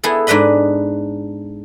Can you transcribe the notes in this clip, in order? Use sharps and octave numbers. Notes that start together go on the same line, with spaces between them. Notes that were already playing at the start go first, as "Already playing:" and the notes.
B3 E4 G#4 A4
G#2 D4 B4 D#5 B5